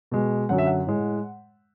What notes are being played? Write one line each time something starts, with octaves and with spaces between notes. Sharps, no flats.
B2 G#3
F#2 D3 F#3 F#5
E5
F#5
A2 G#3